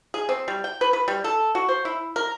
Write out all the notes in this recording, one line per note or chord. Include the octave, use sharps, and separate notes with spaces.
G#4
C4
G3
G5
B4
B4
G3
A4
F#4
C5
E4
A#4